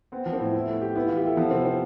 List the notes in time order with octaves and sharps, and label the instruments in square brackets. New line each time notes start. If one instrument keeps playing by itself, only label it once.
[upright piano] B3 [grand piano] C4
[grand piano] F3
[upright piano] C4
[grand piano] A2
E4
A3
G4
[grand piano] B3 [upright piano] E4
[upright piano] F4
[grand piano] E3
[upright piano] G4
[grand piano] E4 [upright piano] A4
[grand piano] F3 [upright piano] B3
[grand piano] C3 [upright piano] C4
[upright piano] C4